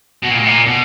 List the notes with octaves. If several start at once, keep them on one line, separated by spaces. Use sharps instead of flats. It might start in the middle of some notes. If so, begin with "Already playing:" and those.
B2
A#2
A2
A#2
B2